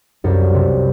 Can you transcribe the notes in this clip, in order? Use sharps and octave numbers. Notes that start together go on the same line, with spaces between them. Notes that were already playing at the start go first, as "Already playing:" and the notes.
C2 F#2
C3